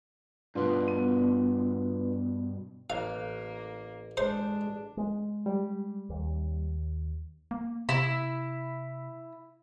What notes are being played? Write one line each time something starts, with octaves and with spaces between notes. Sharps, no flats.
G2 B2 D4 F4 B4
B3
A1 A#3 F5
G#3 D4 C5 C6
G#3
G3
D#2
A#3
C3 E4